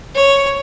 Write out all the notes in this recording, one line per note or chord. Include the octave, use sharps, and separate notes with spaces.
C#5